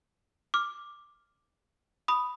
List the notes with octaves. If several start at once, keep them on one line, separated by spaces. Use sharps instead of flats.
D6 F6
B5 D#6